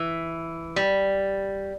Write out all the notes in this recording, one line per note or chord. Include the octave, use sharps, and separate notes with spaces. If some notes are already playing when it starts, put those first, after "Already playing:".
Already playing: E3
G3